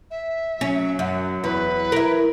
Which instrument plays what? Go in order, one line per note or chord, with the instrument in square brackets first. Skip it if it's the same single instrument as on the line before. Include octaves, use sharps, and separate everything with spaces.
[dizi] E5
[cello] F#3 [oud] C#4
[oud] F#2
[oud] E2 [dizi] B4
[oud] E4 A#4